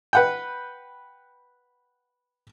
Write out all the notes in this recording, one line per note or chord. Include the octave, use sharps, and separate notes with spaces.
B4 F#5 G5